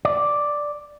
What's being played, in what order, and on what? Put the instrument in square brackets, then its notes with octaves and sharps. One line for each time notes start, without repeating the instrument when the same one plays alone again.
[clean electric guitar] D5